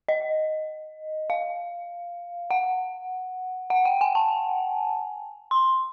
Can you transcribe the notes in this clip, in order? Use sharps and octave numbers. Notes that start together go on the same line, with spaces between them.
D#5
F5
F#5
F#5
G5
G#5
A5
C6